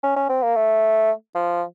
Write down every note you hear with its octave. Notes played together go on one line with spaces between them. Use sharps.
C#4
C#4
C4
A#3
A3
F3